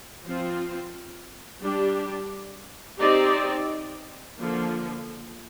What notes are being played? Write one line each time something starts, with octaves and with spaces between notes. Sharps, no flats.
F3 C4 F4 C5
G3 D4 G4
C4 D#4 G4 D5
D3 F3 A#3